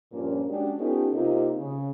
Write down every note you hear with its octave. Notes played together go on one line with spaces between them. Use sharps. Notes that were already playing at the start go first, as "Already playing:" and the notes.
G2 A#2 F3 A#3 C#4
G#3 C#4 D4 F#4 G4
B3 C#4 D#4 F4 G4 A4
C3 A#3 D#4 F4
C#3